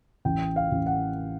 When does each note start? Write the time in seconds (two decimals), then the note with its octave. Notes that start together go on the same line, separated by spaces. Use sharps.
0.25 A1 G5
0.56 F5
0.71 A1
0.86 F#5